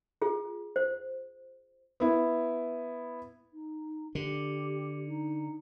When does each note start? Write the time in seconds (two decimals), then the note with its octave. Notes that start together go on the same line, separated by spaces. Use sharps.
0.22 F4 G#4
0.76 C5
2.00 B3 E4
3.53 D#4
4.15 D3 G4
5.07 D#4